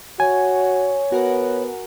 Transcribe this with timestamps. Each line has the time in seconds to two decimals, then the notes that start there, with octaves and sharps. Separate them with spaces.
0.20 F#4 C#5 G#5
1.12 B3 F#4 A#4 F#5